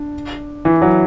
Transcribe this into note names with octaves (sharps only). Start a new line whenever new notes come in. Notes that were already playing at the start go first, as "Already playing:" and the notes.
Already playing: D4
E3
F#3